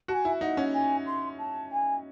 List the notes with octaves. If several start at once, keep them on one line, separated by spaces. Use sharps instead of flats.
F#4 G#5 A5
E4
D#4 F#5
C#4
G#5
C6
A5
G#5